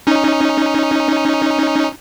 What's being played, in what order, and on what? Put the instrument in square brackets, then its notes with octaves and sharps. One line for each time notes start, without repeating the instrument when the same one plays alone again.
[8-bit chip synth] C#4 D#4